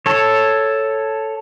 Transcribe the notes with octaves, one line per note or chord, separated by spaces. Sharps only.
A4 C#5